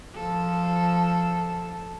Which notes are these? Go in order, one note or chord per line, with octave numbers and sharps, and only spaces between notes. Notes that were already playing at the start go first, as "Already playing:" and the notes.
F3 A4